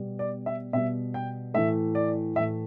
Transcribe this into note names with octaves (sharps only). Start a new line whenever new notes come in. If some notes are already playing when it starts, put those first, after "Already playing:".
Already playing: B2 G3 B3
D5
E5
B2 G3 B3 E5
G5
A2 E3 A3 E5
D5
A2 E3 A3 E5